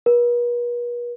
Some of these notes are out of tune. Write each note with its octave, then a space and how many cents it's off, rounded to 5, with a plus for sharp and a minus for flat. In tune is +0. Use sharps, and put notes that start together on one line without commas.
B4 -45